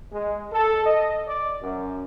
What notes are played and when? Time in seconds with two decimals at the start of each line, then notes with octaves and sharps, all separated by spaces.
0.12 G#3
0.53 A4
0.86 D#5
1.28 D5
1.62 F#2